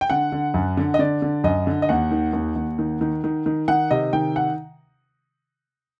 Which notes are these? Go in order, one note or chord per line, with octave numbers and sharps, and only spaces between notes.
G5
D3 F#5
D3
F#2
D3
D#5
D3 D5
D3
F#2 D#5
D3
D#5
D#2 F#5
D#3
D#2
D#2
D#3
D#3
D#3
D#3
D#3 F#5
C3 D#5
D#3 G5
F#5